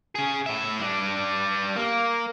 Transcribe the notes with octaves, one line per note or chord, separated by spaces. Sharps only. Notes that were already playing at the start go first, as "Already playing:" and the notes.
C#4 G#4
A2 E5
G3 D4
A#3